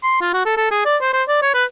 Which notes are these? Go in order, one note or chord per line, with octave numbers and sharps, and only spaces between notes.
C6
F4
F#4
A4
A4
G#4
D5
C5
C5
D5
C#5
B4